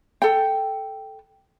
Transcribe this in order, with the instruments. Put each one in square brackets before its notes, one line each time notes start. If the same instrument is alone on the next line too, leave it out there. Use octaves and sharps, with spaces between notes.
[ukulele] A4 G5